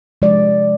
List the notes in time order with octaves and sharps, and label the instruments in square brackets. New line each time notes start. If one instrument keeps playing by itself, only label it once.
[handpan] C3 F3 G#3 D5